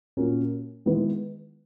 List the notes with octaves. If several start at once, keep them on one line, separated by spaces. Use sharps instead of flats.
A#2 A#3 C#4 F#4
D#3 G#3 B3 E4 B4